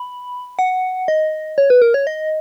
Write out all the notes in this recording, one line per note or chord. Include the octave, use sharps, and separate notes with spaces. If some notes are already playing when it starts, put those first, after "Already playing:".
Already playing: B5
F#5
D#5
C#5
B4
A#4
C#5
D#5